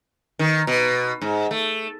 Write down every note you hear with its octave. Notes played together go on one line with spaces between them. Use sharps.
D#3
B2
G#2
A3